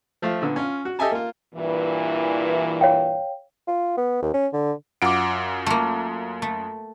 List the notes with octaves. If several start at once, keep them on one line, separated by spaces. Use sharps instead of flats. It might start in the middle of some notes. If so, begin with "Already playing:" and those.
F3 A3 F5
A#2 D3 B3
C#4 F4
F#4
G4 A4 D#5 E5 G#5 A5
A#3 F4
G2 A#2 E3
C#5 F5 G5
F4
B3
D#2
C#4
D3
F#2 F4 F#5 D6 D7
A3 A#3
A3